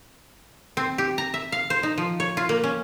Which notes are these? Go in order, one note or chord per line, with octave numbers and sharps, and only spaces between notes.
C4
G4
A#5
E5
F5
C5
D#4
F3
C#5
F4
A#3
C#4